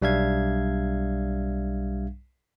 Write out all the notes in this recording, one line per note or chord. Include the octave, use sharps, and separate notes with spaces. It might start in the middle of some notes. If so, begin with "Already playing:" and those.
B1 G3 D4 E5 F5 G#6